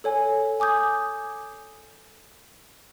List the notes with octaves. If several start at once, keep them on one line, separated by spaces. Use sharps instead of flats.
A4 C#5 G#5
G#5 D6 D#6 G6 G#6